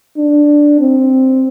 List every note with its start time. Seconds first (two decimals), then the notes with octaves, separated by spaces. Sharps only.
0.17 D4
0.80 C4